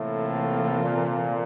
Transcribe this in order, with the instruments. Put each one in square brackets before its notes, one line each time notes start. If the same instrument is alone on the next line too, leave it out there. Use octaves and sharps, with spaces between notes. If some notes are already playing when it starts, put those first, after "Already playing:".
Already playing: [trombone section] A2 [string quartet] C3 E3 A#3 F4 A4
[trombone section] A#2